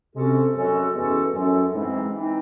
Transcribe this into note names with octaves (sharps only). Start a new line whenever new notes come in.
C3 G#3 C#4 F#4 A4
F#2 G#3 C#4 F#4 A4
E2 G#3 C#4 F#4 A4
F#2 G#3 C#4 F#4 A4
G#2 E3 C4 D#4
E3 C4 D#4